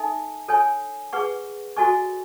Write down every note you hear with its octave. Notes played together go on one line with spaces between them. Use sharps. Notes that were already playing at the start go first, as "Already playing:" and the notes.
Already playing: D#4 A4 E5 G#5
A4 C#5 G#5
G#4 B4 F#5 C#6
F#4 A4 D#5 G#5 C#6